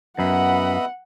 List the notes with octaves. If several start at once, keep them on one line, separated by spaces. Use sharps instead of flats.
F#2 B3 D#5 E5 F#5 B5